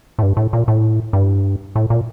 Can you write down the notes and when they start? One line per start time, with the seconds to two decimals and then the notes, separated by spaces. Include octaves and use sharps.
0.19 A2
0.23 G2
0.37 A2
0.53 A#2
0.68 A2
1.13 G2
1.76 A2
1.90 A#2